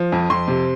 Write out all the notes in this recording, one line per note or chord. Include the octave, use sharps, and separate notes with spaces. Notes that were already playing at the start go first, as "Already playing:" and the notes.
Already playing: F3
F2
F2 C6
C3